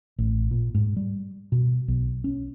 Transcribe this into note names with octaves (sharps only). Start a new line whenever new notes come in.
A1
A#2
G#2
G3
B2
B1
C#4